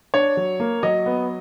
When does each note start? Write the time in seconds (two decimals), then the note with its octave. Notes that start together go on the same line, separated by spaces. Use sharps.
0.14 D4 C#5
0.37 F#3
0.60 A#3
0.83 F#3 D#5
1.06 B3